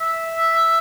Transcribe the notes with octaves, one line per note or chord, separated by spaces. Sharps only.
E5